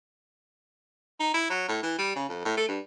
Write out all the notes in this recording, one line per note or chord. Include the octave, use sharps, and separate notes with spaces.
D#4
E4
F#3
A2
E3
G3
C#3
F2
A2
A3
G2